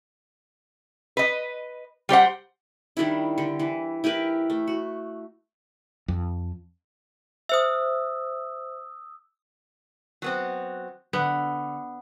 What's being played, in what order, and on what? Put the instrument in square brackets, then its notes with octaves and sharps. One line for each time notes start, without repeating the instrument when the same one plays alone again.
[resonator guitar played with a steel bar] B4 D#5
G3 G4 C5 F#5
[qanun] D#3 G3 D4 E4
D3 G4
E3
E4 G4 A#4 B4
A3
F#4
[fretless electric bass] F2
[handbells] C5 E5 [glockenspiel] D#6 E6
[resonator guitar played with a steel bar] F#3 B3 C4
[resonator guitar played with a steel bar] D3 [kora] B3